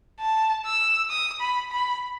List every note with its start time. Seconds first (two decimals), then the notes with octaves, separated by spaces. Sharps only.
0.20 A5
0.65 E6
1.10 D#6
1.41 B5
1.72 B5